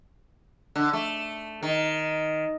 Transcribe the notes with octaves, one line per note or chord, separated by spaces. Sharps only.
D3
A3
D#3